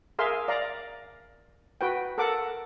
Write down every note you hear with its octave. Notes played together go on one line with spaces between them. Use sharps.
G#4 A#4 E5 F5 C6
D5 F5 A#5
F#4 B4 G5
A4 A#4 F#5 D6